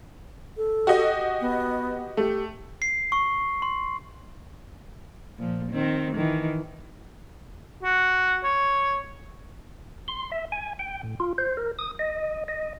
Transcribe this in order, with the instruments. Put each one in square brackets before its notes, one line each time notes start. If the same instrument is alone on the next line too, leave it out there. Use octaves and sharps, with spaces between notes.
[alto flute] A4
[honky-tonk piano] F#4 G4 D#5
[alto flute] B3
[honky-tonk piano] A3 [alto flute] G4
[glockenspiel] C7
C#6
C6
[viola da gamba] A#2 F3
D#3 C4
D#3 E3
[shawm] F#4
C#5
[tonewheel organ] C6
E5
G#5
G5
A2
F4
C5
A#4
D#6
D#5
D#5